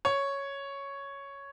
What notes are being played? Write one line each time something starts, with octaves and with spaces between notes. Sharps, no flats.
C#5